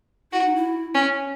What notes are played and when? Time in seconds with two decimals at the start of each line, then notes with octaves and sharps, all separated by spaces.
0.32 E4 F#4
0.44 D#4
0.55 E4
0.95 C#4